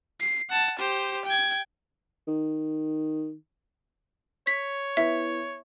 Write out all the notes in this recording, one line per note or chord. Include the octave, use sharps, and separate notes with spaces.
C7
F#5 A5
G4 C5
G5 G#6
D#3
C#5 B6
B3 E4 E5